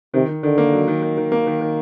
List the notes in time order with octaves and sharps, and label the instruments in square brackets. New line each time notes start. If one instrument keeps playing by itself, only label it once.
[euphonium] C3 [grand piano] D#3
[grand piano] D#3
[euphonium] D3 [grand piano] D#3
[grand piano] A#3
F#3
D#3
D#3
D#3
A#3
D#3
D#3